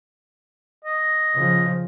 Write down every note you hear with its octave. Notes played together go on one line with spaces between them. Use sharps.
D#5
C#3 F3